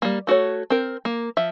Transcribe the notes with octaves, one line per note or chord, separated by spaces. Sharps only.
G3 A#3
A3 F#4 A4 C#5
C4 A#4
A#3
F3 E5